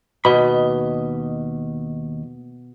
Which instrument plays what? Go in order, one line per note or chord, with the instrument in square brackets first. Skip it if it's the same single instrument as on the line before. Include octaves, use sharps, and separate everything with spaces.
[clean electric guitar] D#2 D#5 B5 [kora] B2